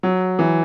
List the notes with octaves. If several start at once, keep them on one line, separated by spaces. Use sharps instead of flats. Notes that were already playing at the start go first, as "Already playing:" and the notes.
F#3
E3